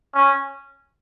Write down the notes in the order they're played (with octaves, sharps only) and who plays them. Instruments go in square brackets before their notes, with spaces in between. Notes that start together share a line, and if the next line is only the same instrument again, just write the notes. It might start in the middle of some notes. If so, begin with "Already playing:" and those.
[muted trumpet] C#4